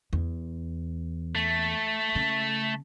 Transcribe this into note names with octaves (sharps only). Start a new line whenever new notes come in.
E2
A3
C#3